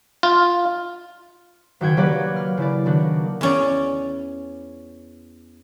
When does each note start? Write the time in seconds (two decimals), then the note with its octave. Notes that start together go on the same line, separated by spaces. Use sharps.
0.23 F4
1.81 F#1 D#3 F#4 G5 G#6
1.97 F#3 A#3 F#4 G4 B4 D5
2.36 F6
2.57 C#3 E4 D5
2.86 D#3 A#3 D4 F#4
3.41 E2 C#4 D5